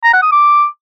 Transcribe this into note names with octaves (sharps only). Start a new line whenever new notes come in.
A#5
F#5
D#6
D6